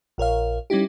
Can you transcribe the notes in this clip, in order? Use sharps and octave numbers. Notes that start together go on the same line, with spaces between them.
A#1 A#4 C#5 F5
G3 C#4 D#4 E4 G4